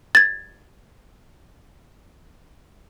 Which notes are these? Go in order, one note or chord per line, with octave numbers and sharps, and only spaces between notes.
G#6 A6